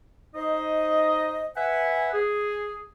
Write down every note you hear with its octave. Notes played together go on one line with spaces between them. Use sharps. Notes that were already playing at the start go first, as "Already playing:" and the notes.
D#4 C5 D#5
B4 E5 F#5 G#5
G#4